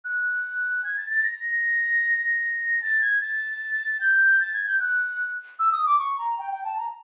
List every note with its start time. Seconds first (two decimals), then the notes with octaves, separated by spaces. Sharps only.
0.04 F#6
0.84 G#6
0.97 A6
1.10 A6
1.23 A#6
2.82 A6
3.01 G#6
3.21 A6
4.00 G6
4.40 A6
4.54 G#6
4.67 G6
4.80 F#6
5.59 E6
5.72 D#6
5.86 D6
5.99 C#6
6.18 A#5
6.38 G5
6.52 G5
6.64 A5
6.77 A#5